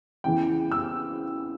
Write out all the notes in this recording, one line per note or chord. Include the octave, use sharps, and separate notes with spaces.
E2 C#3 E3 G5
E6